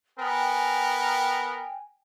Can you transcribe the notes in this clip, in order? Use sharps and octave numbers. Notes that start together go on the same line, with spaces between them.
B3 A#4 G5 G#5